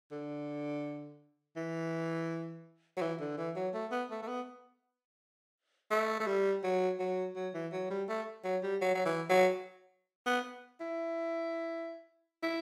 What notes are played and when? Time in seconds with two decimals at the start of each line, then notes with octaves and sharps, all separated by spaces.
0.12 D3
1.57 E3
2.97 F#3
3.01 E3
3.20 D3
3.37 E3
3.56 F#3
3.74 A3
3.92 B3
4.11 A3
4.22 A3
4.28 B3
5.91 A3
6.20 A3
6.27 G3
6.63 F#3
6.99 F#3
7.36 F#3
7.54 E3
7.73 F#3
7.90 G3
8.09 A3
8.44 F#3
8.63 G3
8.81 F#3
8.94 F#3
9.05 E3
9.29 F#3
10.26 B3
10.80 E4
12.43 E4